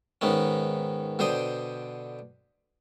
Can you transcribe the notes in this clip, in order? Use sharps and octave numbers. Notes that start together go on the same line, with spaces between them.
G#2 D#3 B3 C#4
B2 D3 C5 G5 D#6